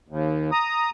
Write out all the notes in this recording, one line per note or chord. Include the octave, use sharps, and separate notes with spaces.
D#2
A#5 D#6